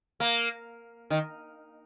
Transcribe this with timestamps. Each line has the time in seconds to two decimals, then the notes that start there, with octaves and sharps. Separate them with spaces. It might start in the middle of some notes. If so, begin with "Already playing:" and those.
0.20 A#3
1.10 D#3